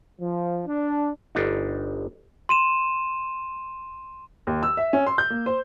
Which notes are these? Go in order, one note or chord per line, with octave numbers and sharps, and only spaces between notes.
F3
D4
G1 D4 D#4
C6 D#7 E7
D#2
E6
E5
C#4
C6
G6
A#3
C5